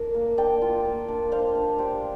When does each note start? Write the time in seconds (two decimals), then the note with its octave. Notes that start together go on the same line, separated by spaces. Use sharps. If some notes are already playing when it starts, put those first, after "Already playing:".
Already playing: D4 A#4
0.14 A#3
0.37 D4 D5 G5
0.62 F4
0.85 A#3
1.08 D4
1.32 D4 C5 F5
1.55 D4
1.78 D4 G4 C5